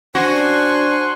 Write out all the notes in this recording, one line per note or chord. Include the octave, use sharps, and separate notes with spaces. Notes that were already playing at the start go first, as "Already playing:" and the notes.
D4 F#4 C5 F#5 G#5 C6 C#6